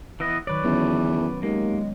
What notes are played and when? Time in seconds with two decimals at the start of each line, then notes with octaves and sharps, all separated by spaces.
0.20 E3 B3 D#5
0.47 D#3 F#3 B4 C#5 D5
0.64 E2 D3 E3 F#3 B3 C#4
1.43 D#2 G#3 A#3